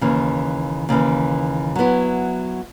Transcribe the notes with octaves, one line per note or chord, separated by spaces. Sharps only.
D#2 C#3 E3
D#2 C#3 E3
F#3 B3 E4